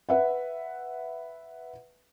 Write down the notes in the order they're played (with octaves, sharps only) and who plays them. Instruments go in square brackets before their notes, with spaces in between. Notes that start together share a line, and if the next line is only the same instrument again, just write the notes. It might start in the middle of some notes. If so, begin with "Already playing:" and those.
[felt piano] B4 E5 F#5